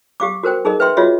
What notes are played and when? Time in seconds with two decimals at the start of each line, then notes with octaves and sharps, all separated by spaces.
0.20 G4 F5 D6
0.43 F#4 A#4 C5 G5
0.65 D#4 G#4 A#4 D#5
0.80 B4 E5 G5 C6
0.97 F4 F#4 G#4 C#5 D#5 E5